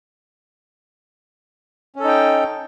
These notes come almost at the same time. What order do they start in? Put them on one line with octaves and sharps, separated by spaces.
C#4 A4 D#4 G5